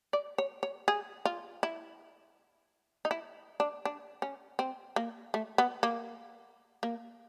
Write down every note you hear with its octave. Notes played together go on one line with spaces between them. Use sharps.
D5
C#5
C#5
G#4
F4
E4
D#4
E4
D4
D4
C#4
C4
A#3
A3
B3
A#3
A#3